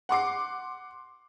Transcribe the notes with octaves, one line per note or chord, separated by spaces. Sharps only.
F#5 C6 D6 C7